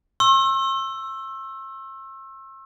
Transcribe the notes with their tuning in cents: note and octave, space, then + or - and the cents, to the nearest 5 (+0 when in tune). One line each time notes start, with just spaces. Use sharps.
C6 +45 E6 +10